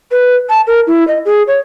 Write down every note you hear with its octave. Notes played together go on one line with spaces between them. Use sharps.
B4
A5
A#4
E4
D#5
G#4
C#5